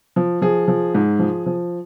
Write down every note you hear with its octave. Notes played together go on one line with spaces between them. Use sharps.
F3
F3 G#4
F3
G#2
F3
F3